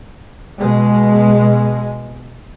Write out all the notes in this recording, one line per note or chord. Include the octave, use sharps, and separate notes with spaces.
B2 G#3